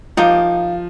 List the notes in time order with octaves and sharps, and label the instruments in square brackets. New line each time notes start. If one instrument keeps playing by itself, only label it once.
[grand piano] F3 [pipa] A#3 D#4 G4